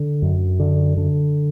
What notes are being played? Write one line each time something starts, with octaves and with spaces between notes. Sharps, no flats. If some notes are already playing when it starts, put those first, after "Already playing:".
Already playing: D3
F#2
D3
D3